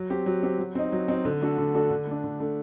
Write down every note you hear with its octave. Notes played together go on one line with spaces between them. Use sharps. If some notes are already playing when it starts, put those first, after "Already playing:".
Already playing: F#3
C4 G4
F#3
C4 G4
F#3
C4 D#4
F#3
C4 D#4
D3
A3 D4 F#4 A4
D3
A3 D4 F#4 A4
D3
A3 D4
D3
A3 D4